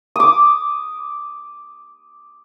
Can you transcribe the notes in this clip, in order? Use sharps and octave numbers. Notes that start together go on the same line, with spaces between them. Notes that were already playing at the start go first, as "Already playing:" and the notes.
D6 D#6